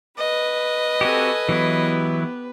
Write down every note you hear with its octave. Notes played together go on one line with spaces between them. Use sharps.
B4 D#5
C4 F#4 G4 A4 G#5
E3 F#3 B3 E4 G4